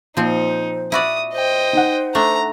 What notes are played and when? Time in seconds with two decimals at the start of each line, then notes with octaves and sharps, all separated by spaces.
0.17 A#2 F3 C4 D#4 C5
0.92 E4 F#4 D5 D#6
1.33 C5 D#5 G5
1.73 D#4 F#5
2.15 A3 D4 A#5